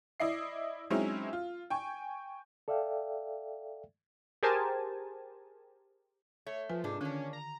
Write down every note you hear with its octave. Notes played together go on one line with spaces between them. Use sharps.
E4 D5 D#5 C7
F#3 G#3 C4 C#4 D#4 E4
F4
G5 G#5 C#6
A4 D5 E5 F5 G5
G4 G#4 A#4 C5 G#5 A5
A3 C#5
F3 F4 B4 G#5
G#2 C3 D4 G#4
D3 D#3 A#3 C#4 D4
A#5